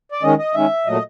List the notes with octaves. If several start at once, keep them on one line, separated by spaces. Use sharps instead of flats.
D5
D#3 G#3 C#4 D#5
D#5
D#3 G#3 C#4 E5
A#2 F#3 A3 D#5